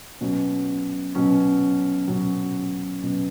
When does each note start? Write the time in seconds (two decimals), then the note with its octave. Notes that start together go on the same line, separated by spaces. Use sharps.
0.21 B2 F#3 C#4
1.15 B2 F#3 C#4
2.08 B2 F#3 C#4
3.02 B2 F#3 C#4